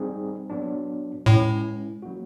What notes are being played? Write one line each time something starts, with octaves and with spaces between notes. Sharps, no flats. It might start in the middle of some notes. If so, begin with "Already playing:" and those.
Already playing: G3 C4 D#4 G#4
F#3 B3 D4
A2 G#3 C#4 E4
F#3 A#3 C#4 F#4